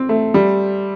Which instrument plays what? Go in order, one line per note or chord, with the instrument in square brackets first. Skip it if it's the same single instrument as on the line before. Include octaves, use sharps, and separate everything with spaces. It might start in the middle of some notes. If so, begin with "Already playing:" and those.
Already playing: [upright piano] C4
A3
G3